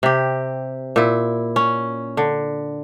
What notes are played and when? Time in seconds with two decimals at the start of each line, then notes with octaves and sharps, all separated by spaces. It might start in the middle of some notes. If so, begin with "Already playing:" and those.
0.03 C3 G4
0.96 A#2 E4
1.56 C#4
2.17 D3